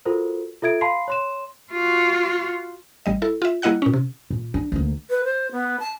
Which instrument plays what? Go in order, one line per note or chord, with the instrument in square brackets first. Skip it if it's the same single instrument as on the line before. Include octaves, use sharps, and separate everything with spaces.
[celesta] F4 F#4 A4 A#4 C5
F4 A4 E5 G#6 D7
F5 A5 B5 C6 C7
C#5 C6 E7
[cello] F4 F#4
[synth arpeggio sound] A1 G3 D#5
E4 A4
F4 E5
G3 A#3 E4 D#5 F#5 F#6
A#2 C#4
C3
[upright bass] A#2
D4
D2 A#3
[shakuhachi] B4
C5
B3
A5